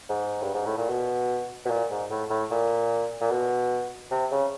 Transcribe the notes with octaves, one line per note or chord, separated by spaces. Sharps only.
G#2
G2
G#2
A2
A#2
B2
B2
A#2
G#2
A2
A2
A#2
A#2
B2
C3
C#3